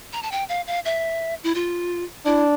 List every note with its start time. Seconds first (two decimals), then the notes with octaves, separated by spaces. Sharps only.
0.13 A#5
0.22 A5
0.32 G5
0.49 F5
0.67 F5
0.85 E5
1.44 E4
1.55 F4
2.26 D4 E4